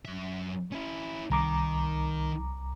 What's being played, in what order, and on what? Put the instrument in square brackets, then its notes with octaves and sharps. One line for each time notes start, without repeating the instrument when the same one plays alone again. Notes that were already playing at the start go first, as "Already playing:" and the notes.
[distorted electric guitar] F#2 E5
C#4 E4
[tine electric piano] C2 A#5 D6 [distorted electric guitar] D#3